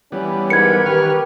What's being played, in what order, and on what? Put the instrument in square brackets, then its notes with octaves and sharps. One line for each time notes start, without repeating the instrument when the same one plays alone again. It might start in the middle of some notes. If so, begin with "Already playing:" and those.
[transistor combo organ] E3 G3 B3 [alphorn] C#4
[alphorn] G#2 [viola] A#4 B4 [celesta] G#6 C#7
[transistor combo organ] D#3 C#6 F6 [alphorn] G4